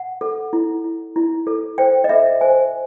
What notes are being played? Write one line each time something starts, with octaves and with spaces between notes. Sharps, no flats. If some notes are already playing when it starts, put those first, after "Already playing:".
Already playing: F#5
A4
E4
E4
E4
A4
C5 G5
D#5
A4 E5
C5 G#5